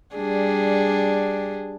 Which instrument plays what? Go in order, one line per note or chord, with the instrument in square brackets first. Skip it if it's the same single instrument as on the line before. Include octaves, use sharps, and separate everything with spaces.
[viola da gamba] G3 D4 G#4